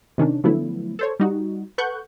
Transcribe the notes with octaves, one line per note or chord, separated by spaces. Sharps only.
C3 D#3 C#4 D4
D3 F3 F#3 A3 B3 E4
A4 C5 C#5
G3 D#4 F#4
A4 B4 F#5 C#6 F#6 G6